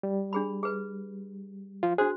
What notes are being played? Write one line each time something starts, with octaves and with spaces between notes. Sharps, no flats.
G3
D4 G#4 B5
G#4 B4
F3 F4
D4 F#4 G#4 C5